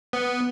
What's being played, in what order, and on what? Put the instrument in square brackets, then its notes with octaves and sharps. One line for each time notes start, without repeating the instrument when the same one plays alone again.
[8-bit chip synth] B3